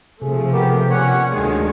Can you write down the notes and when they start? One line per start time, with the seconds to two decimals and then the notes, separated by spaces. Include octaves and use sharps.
0.22 C3 F3 A3 G#4
0.53 B3 G4 A#4
0.90 A#2 C#4 C#5 F#5
1.32 D2 D3 D#3 G#3 G#4 C#5